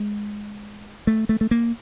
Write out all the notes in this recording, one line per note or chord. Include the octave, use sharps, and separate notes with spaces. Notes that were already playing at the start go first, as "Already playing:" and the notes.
Already playing: G#3
A3
A3
A3
A#3